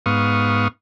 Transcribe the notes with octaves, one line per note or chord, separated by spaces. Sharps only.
G#2 B3 F5 C#6 D#6